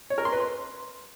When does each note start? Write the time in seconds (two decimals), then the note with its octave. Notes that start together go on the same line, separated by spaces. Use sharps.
0.10 C#5
0.18 A#4
0.25 C6
0.33 B4
0.40 C6